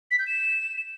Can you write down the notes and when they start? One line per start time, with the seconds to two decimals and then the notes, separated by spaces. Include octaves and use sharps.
0.11 B6
0.19 G6
0.27 E7